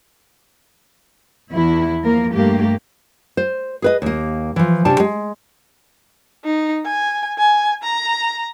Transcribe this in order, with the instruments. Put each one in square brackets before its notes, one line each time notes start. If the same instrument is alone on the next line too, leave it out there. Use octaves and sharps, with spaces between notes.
[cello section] E2 E4
F3 A#3 A#4
G2 A3 A#3 G4
[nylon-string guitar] C5
G#4 B4 D#5
D#2 A#3
E3 F3
C3 C#4 D4 G4 A5
G#3
[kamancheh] D#4
G#5
G#5
A#5